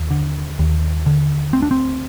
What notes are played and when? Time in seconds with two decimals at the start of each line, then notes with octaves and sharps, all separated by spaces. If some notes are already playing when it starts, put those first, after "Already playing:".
Already playing: D#2
0.11 D3
0.59 D#2
1.06 D3
1.53 D2 C4
1.62 D4
1.71 C4